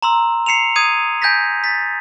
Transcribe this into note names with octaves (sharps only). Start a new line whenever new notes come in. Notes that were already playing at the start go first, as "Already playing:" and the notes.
A#5 C6 E6
C7 C#7 E7 F7
D#6 G#6 C7 D#7
G#5 G6 G#6 A#6 B6
A6 B6